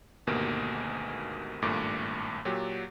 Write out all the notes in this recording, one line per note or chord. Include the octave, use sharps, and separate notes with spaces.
G#1 D2 G#2 B2 A#3 G4
G#1 G2 A#2 A3 D6
A#2 F#3 G4